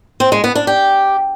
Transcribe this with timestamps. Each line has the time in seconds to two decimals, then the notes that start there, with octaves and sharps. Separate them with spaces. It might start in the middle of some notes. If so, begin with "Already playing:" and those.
0.20 C4
0.32 G#3
0.44 B3
0.55 D4
0.67 G4